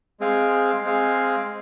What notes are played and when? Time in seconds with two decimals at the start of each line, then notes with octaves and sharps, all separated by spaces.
0.20 G#3 C4 G#4 F5
0.84 G#3 C4 G#4 F5